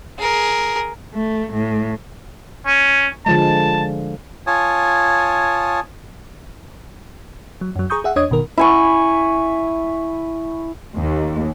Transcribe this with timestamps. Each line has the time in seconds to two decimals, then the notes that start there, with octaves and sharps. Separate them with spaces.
0.18 G#4 A#4
1.14 A3
1.53 A2
2.66 C#4
3.26 D3 F3 G#3 A5
4.47 F4 C#5 G#5 A5 D#6
7.61 F#3
7.76 F#2 F#3
7.90 G#4 A#5 C#6 D#6 G6
8.04 G#4 E5 F#5
8.16 E2 D4 C#5 D#5 D#6 G#6
8.30 G1 B2 D#3 A#4
8.57 E4 G#5 C#6
10.96 D#2